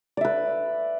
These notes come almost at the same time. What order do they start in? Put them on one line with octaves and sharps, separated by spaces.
D5 E5 B4